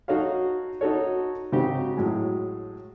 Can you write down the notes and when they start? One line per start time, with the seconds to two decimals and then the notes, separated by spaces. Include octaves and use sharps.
0.08 D#4 F#4 A4 C#5 F5
0.81 D#4 F#4 A4 C#5
1.52 G#2 C#3 C4 D#4 F#4 G4
1.97 A2 F#3 G#3